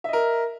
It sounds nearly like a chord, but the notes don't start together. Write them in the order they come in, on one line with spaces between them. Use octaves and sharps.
E5 D#5 A#4